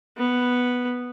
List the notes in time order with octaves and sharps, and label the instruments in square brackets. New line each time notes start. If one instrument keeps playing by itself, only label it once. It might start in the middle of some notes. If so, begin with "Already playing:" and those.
[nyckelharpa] B3